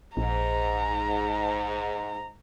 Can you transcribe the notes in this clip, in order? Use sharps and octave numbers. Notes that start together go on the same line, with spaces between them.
A#1 G#2 A#5